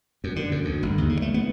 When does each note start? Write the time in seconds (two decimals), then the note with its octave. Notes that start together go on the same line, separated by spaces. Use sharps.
0.24 F#2
0.36 D3
0.51 F#2
0.65 D2
0.83 G1
0.98 D#2
1.09 C#3
1.22 A3
1.34 B3